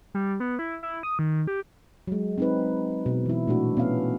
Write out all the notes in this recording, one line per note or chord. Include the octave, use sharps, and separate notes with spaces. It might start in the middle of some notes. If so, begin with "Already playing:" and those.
G3
B3
E4
E4
D#6
D#3
G4
F#3 G#3
C4 D#4 B4
B2
E3 E4
A#2 A3 D4 F#4
B3 C#4 F5